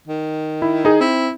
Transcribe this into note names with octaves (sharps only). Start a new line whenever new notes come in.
D#3
E4
D#4 G#4
C4 E4